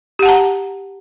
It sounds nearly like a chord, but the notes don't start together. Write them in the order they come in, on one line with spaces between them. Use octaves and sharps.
G4 F#5 A5 A#5